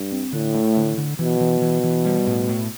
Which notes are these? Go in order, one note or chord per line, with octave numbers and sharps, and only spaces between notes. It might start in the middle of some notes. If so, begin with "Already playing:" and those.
Already playing: G2
C4
A2 D3
A3
D3
D3
B2 E3
E3
E3
E3
G3
A2
A2